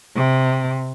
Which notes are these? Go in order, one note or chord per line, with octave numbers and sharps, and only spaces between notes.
C3